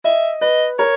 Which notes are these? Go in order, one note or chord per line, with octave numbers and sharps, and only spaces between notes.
D#5 E5
B4 D#5
A#4 C#5